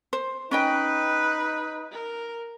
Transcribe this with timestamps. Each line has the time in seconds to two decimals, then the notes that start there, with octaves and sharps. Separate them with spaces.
0.13 C5
0.51 C#4 D#4 B4 D#5 G5
1.92 A#4